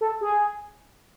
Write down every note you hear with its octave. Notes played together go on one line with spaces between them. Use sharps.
A4
G#4